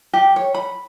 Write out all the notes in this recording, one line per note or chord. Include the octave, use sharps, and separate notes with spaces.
G4
C#5
B5